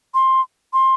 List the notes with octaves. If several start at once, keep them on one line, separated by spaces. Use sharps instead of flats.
C6
C6